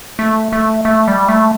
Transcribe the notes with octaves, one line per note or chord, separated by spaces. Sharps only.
A3
A3
A3
G3
A3